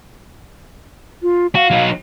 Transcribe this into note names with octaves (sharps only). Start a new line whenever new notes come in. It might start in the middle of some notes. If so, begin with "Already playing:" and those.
F4
F#4 F5
F#3 D#4